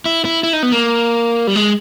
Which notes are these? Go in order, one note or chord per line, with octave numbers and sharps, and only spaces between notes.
E4
E4
E4
D#4
B3
A#3
G3
G#3